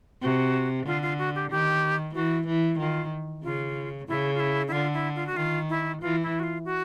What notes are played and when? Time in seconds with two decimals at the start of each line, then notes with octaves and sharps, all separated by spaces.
0.22 C3 F#4
0.86 D3 F4
1.02 F4
1.19 F#4
1.35 G4
1.51 D#3 G4
2.14 E3 F#4
2.47 E3
2.79 D#3 F4
3.43 C#3 F4
4.08 C#3 E4
4.34 F4
4.40 E4
4.68 E4
4.72 D3 F4
4.94 E4
5.15 F4
5.27 F#4
5.36 D#3 F4
5.70 E4
6.01 E3 F4
6.23 E4
6.39 F#4
6.43 F4
6.65 F#4